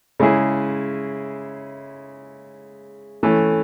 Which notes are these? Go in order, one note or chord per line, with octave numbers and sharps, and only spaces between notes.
C#3 G#3 C#4 E4 G#4
E3 A3 C#4